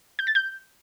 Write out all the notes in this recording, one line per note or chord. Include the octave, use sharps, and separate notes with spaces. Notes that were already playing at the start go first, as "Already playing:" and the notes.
G6
A6
G6